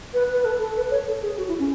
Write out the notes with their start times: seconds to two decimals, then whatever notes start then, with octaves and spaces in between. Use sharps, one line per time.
0.14 B4
0.33 B4
0.45 A4
0.60 A4
0.76 B4
0.91 C#5
1.08 A4
1.22 G#4
1.38 F#4
1.48 E4
1.59 C#4